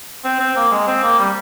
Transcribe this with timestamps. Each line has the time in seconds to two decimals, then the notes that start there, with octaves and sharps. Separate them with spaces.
0.24 C4
0.40 C4
0.56 A#3
0.72 G#3
0.88 C4
1.03 A#3
1.19 G3